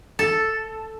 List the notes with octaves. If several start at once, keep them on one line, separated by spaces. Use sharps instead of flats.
A4